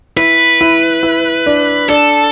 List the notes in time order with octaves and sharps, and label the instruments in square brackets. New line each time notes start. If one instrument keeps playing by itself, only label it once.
[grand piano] E4 [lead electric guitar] B4
[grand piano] E4
E4
D4
[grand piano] D4 [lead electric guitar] A4